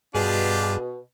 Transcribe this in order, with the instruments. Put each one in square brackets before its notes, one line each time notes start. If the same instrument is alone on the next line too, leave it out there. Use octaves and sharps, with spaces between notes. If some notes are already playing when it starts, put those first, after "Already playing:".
[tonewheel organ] G2 [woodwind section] B2 [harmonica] D4 F4 G4 [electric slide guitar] G#4